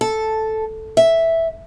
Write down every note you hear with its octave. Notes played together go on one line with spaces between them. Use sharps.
A4
E5